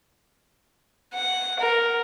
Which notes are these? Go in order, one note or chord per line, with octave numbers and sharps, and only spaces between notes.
F#5
A#4